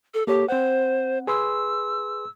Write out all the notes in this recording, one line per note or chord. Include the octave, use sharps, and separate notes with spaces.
A4
A#3 G4 A4 C#5
C4 C5 F#5
G#4 B4 C6 E6